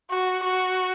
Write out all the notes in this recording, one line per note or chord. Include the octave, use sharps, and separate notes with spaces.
F#4
F#4